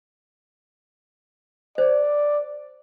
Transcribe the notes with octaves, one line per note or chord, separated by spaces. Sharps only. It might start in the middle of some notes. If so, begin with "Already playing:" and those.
C5 D5